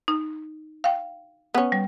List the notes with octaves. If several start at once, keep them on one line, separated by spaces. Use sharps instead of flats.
D#4
F5 G5
B3 C#4
G3